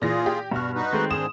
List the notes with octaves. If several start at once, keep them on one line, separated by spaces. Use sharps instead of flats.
A#2 E3 F4 G#4 A#6
G4
G2 B2 F#4 F6
D#4 F#4 B4
D#3 G#3 A3 C4
G#2 D3 G#4 D#6 E7